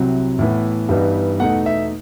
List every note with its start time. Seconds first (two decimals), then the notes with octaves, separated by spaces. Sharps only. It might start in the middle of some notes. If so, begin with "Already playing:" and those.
Already playing: C2 C3 F#3
0.39 A2 E3 B3
0.89 G2 E3 G3 B3 D#4
1.39 E2 B2 A3 D#4 F#5
1.66 E5